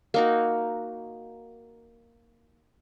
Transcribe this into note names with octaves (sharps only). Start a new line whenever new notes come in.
A#3 D#4 F#4